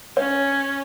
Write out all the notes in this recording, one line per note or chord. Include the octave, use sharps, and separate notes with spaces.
C#4 C#5